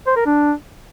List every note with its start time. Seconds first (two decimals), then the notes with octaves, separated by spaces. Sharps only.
0.07 C5
0.16 A#4
0.26 D4